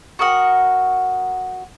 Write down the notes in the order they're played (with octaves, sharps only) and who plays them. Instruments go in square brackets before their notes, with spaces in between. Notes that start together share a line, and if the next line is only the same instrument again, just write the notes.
[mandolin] F#4 A#4 D#5 F#5